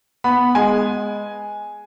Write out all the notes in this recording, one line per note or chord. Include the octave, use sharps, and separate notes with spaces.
B3 B5
G#3 G#5